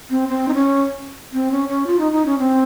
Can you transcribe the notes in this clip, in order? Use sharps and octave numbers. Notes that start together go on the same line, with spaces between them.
C4
C4
D#4
C#4
C4
C#4
C#4
F4
D#4
D#4
C#4
C4